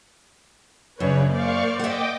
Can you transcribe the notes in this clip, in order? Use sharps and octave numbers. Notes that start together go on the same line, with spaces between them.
F#2 C#3 D4 B4 C#5
A#3 C5 D5 F5 C#6
D#5 E5 F#5 G5 D6